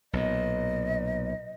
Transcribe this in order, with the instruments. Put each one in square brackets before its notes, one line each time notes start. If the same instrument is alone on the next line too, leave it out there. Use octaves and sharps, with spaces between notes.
[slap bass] B1 A#2 [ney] D#5